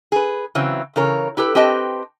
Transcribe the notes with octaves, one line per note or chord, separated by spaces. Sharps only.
G#4 B4
C#3 E3 F#3 C4
C#3 E3 A#4 C#5
E4 G4 A4 B4
C4 G4 B4 D#5 A5